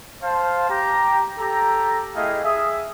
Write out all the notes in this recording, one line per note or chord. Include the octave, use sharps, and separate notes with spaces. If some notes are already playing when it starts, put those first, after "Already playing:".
C5 F5 A5
G4 A#5
G4 A4 A#5
A3 E4 G4 G#4 D#5 F5
G#4 E5 D#6